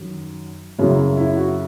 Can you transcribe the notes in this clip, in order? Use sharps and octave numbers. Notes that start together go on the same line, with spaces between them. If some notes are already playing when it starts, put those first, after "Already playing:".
Already playing: F#2 D#3 F#3
F#2 C#3 F#3 E4
E4
F#4